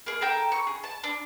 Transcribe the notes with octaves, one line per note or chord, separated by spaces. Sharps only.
A#3 G#4
A4 A#4 G5
C#6
G#4
A5
D4